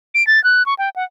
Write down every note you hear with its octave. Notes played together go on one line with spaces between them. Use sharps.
D7
A6
F#6
C#6
G5
F#5